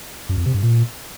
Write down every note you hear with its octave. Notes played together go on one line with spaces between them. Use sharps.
F#2
F2
C3
G2
A#2